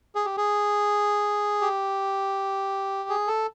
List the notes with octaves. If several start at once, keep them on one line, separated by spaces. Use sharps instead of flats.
G#4
G4
G#4
G4
G#4
A4